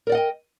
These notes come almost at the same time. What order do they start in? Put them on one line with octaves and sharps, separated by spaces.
A#4 D5 F#5 D#5 G5